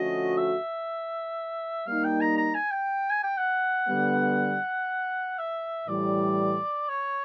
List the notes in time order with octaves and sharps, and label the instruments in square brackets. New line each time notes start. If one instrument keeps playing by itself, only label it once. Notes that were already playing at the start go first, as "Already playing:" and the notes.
Already playing: [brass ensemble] D3 F3 A3 C#4 F#4 [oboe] D#5
[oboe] E5
[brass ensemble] G3 A#3 D#4 [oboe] F5
[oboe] G5
A#5
A#5
G#5
G5
G#5
G5
F#5
[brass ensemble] D3 G3 B3
[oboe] E5
[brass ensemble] A2 E3 G3 [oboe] D5
[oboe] C#5